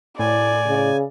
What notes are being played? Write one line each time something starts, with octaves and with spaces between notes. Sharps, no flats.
A2 D5 G#5
C#3